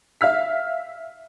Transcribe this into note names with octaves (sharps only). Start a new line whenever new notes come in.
E5 F5 F6 B6